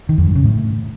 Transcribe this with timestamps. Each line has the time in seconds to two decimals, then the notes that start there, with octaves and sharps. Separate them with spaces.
0.09 D#3
0.18 F2
0.27 G2
0.35 C#3
0.44 A2